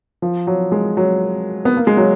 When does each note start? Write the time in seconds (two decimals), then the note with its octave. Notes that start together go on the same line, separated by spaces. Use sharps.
0.22 F3
0.47 F#3
0.72 G#3
0.97 F#3
1.65 B3
1.77 A#3
1.87 G#3
1.97 F#3